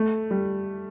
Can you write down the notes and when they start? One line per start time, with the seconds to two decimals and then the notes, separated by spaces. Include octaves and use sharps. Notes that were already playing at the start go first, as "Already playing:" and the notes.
Already playing: A3
0.31 G3